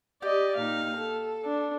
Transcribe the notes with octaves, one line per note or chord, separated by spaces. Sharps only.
G4 D5 D#5
A#2 D#4 F5
A4
D4